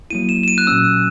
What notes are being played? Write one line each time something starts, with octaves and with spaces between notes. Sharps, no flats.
F#3 A#3 E4 D#7
E7
E7
D#7
F#6
A#2 F#3 C#4 E6